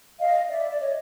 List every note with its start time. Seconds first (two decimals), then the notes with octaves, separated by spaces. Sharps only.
0.19 D#5 F5
0.49 D5 E5
0.70 D5
0.79 C#5 D#5